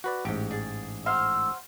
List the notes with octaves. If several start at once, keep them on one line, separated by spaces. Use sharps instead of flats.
F#4 B4 D5
A1 G#2 G4
G#4 D5
F#4 C5 F5 E6